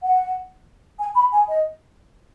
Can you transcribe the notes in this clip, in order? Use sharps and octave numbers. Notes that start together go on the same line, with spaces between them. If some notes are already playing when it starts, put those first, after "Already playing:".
F#5
G#5
B5
G#5
D#5